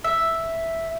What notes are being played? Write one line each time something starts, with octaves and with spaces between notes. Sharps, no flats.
E5